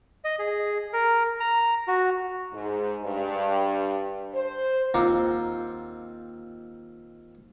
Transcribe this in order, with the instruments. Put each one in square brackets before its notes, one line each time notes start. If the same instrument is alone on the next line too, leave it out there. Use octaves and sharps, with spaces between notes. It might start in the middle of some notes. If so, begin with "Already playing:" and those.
[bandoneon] D#5
G#4
A#4
A#5
F#4
[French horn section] G#2
G2
C5
[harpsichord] D#2 C4 F4 F#5 A#5 D6